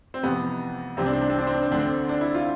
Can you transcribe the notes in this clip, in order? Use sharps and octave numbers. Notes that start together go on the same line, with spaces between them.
C4
F2 C3 E3 B3
C2 C3 E3 C4
D4
C4
D4
C4
D4
C4
D4
C4
D2 D3 D4
C4
D4
E4
F4